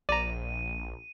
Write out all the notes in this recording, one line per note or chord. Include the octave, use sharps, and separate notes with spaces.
A#1 D5 A#5 D#7